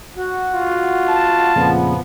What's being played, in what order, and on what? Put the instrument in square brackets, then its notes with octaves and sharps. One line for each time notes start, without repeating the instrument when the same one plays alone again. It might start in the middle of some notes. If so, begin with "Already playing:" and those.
[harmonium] F#4
[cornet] F4
[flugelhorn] A5
[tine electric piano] F2 A#2 C#3 [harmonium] F3 B3